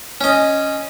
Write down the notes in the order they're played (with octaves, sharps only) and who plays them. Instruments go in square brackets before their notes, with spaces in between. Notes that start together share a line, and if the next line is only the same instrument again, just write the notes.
[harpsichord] C#4 D#5